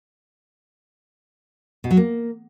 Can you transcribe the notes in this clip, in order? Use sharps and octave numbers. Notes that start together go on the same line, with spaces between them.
B2
F#3
A#3